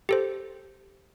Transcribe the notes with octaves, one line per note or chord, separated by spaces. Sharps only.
G4 A4 C5